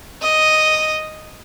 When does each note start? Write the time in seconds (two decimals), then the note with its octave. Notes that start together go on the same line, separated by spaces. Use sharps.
0.22 D#5